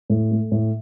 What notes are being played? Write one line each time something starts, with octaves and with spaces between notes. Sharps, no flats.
A2
A3
A2